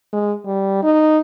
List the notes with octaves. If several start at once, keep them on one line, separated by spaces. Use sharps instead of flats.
G#3
G3
D#4